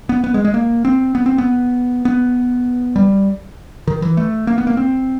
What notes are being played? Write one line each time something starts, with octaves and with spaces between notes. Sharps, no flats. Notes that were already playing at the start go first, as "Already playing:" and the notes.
B3
B3
G#3
G#3
A#3
C4
B3
C4
B3
B3
G3
D#3
E3
A3
A#3
B3
A#3
C4